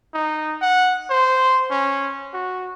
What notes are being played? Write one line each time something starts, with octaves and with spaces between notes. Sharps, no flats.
D#4
F#5
C5
C#4
F#4